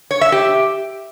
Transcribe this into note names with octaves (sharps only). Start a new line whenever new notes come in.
C#5
E5
G4